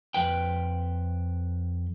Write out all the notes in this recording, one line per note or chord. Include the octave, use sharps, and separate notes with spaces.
F2 B4 G5